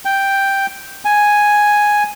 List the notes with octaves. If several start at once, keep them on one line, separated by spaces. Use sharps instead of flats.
G5
G#5